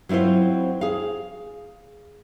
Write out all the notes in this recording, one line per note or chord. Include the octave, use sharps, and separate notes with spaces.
F#3 C4 E4 F4 C5
G#4 F5